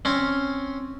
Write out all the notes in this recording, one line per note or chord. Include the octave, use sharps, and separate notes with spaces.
C4 C#4